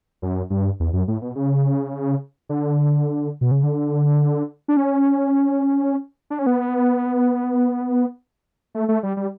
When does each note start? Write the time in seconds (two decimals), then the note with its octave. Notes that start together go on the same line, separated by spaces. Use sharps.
0.22 F#2
0.50 G2
0.80 E2
0.93 F#2
1.08 A2
1.22 B2
1.35 C#3
2.49 D3
3.41 B2
3.51 C#3
3.63 D3
4.68 D4
4.77 C#4
6.30 D4
6.39 C#4
6.47 B3
8.75 A3
8.89 A3
9.03 G3
9.17 G3